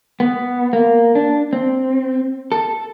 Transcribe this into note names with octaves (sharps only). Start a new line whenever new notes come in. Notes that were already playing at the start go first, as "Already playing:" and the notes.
B3
A#3
D4
C4
A4